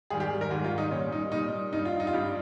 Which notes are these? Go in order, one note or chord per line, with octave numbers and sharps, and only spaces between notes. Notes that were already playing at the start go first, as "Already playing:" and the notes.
G#2 D#3 G3 G#4
G4
A#4
G#2 D#3 G3 G4
F4
D#4
A#2 G3 C#4
D#4
A#2 G3 D#4
G2 G3 D#4
F4
D#4
F4
G2 G3 G4